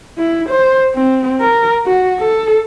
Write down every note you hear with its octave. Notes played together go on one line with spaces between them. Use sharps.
E4
C5
C4
A#4
F#4
A4